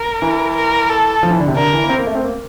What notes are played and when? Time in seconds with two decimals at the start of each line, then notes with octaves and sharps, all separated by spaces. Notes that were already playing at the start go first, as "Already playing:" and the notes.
Already playing: A#4
0.22 E3
0.55 A#4
0.89 A4
1.23 F3
1.31 E3
1.40 D3
1.48 C3
1.56 D3 A#4
1.73 E3
1.84 A#3
1.89 C4
1.98 A#3
2.07 A3
2.15 C4
2.24 A#3